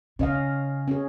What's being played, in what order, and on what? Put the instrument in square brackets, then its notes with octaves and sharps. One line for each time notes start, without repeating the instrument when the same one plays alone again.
[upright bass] C#3 [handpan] C#4 D#5 F5
[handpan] C#4 G#4